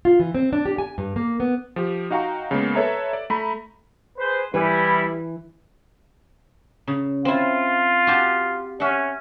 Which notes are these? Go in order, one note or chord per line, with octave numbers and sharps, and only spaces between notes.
F4
E3
C4
D4
G4
G#5
G2
A#3
B3
F3 G4
D#4 F#4 F5 G5 A#5 C#6
C#3 G#3 A#3 B3
A4 B4 C#5 E5 A#5
D5
A3 A#5 B5
G#4 B4 C5
E3 G3 E4 B4
C#3
C4 E4 F4
F#4 G4 A5
C#4 E5 F#5